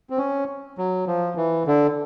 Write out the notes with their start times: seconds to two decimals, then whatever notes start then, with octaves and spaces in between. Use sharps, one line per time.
0.10 C4
0.18 C#4
0.78 F#3
1.07 F3
1.37 E3
1.67 D3